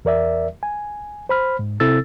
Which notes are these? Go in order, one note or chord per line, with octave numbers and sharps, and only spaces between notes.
E2 A#4 D5 E5
G#5
C5 B5 F6
G#2
C3 C4 E4 A4 E6 A6